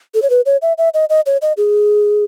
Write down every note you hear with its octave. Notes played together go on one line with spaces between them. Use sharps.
A4
C#5
B4
C#5
E5
E5
D#5
D#5
C#5
D#5
G#4